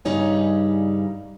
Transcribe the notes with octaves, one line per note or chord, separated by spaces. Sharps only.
G2 C#3 G3 D#4 C#5 G#5